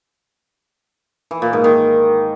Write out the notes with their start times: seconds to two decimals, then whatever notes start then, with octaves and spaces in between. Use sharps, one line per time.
1.31 E3
1.42 A#2
1.53 G#2
1.64 D#3